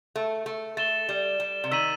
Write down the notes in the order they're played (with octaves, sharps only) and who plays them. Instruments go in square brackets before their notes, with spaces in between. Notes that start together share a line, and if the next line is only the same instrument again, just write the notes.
[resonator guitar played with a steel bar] A3
A3
[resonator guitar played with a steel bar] A3 [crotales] A6 E7 G7
[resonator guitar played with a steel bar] G3
G3
C3
[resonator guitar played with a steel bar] D#3 [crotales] E6 B6 D#7 F#7